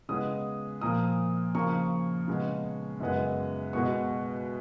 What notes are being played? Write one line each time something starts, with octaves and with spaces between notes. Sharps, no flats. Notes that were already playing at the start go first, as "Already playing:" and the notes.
C#3 G#3 B3 D#6
A#2 F3 A#3 D#6
C#3 F3 A#3 C#6
C#3 G#3 B3
F#2 C#3 G#3 B3
B2 G#3 B3 C#6